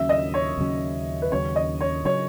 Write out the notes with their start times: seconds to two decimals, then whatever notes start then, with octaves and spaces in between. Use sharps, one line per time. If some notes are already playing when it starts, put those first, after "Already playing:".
Already playing: D#2 C#3 F#3 C#4 E5
0.09 D#5
0.34 C#5
0.58 D#2 C#3 F#3 C#4
1.22 B4
1.32 D#2 C#3 F#3 C#4 C#5
1.56 D#5
1.81 C#5
2.05 C#3 F#3 C#4 C#5